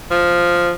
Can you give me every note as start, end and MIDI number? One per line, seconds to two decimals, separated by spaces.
0.11 0.71 53